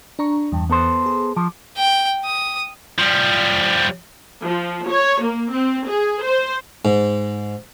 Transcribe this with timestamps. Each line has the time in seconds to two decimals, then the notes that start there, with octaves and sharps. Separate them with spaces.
0.19 D4 A#5 C#6
0.52 E2 G2
0.70 B3 A4 C5
1.06 G#4
1.36 F3 D6
1.77 G5
2.25 D#6
2.98 F3 G3
4.43 F3
4.88 C#5
5.23 A#3
5.53 C4
5.87 G#4
6.22 C5
6.85 G#2